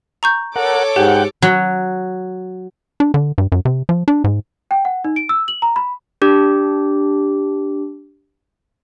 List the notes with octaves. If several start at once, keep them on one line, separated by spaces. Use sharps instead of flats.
A#5 C#6 G6
A4 A#4 C#5 F#5 D6
G#2 G4 F#5 G5
F#3
D4
D3
G2
F#2
C3
F3
D4
G#2
G5
F#5
D#4
D7
E6
F#7
A#5
B5
D4 G4